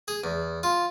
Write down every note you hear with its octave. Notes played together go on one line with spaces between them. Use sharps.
G#4
E2
F4